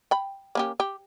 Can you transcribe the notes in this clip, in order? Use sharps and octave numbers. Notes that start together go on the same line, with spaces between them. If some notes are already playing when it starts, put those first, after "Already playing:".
G5 B5
A#3 C#4 G4
G4